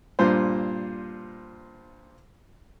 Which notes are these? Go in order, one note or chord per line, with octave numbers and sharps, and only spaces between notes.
G2 A#2 C5